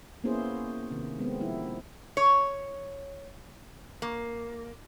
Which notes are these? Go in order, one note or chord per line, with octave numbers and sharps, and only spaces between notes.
A#3 B3 C#4 E4 G#4 C5
C3 D#3
G#3 B3 C4
F3 D#4 E4
C#5
A#3